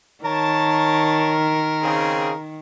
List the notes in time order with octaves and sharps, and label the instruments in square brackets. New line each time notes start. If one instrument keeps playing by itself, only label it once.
[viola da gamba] D#3 [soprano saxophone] A#4 [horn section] C#5 A5
[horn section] C#3 C4 G#4